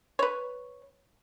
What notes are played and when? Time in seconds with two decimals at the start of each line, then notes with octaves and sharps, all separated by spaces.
0.19 B4 C#5